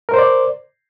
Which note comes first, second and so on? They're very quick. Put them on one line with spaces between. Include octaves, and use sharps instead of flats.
A#4 C5 D5